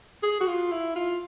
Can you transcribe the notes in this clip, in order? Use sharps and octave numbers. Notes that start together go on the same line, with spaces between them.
G#4
F#4
F4
E4
F4